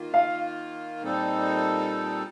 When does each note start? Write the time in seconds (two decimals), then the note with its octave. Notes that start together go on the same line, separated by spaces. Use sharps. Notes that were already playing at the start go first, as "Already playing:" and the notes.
Already playing: D#3 A#3 F4
0.14 F5
1.02 A#2 G3 C4 D#4 A4